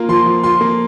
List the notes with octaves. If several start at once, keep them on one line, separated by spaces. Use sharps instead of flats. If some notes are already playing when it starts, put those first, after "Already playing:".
Already playing: A#3 F4
F3 C6
F3
F4 C6
A#3